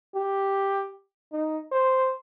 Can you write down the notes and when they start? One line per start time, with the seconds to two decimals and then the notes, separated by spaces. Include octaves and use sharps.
0.15 G4
1.33 D#4
1.72 C5